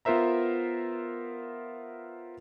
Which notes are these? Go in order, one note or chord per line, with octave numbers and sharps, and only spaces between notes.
B3 F4 A#4 C5 E5 A#5